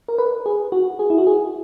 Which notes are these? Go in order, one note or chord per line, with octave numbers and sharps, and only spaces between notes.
A#4
B4
G#4
F#4
G#4
E4
F#4
G#4